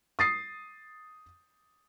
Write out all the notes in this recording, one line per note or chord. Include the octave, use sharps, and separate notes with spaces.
D#6 A6 C7